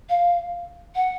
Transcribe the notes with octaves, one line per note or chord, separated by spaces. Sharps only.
F5
F#5